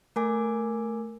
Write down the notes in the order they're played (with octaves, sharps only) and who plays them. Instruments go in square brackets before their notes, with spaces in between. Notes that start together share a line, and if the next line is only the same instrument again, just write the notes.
[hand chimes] A3 A#4 G#5 D6